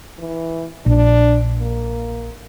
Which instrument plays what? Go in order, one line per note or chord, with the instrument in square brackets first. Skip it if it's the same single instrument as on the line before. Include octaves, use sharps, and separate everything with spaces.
[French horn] E3
[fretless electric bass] A#1 [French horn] D4
[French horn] A#3